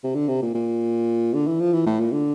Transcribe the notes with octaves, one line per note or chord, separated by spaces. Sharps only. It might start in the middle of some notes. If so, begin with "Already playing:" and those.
C3
D3
C3
A#2
A#2
D3
E3
F3
E3
A2
A#2
D3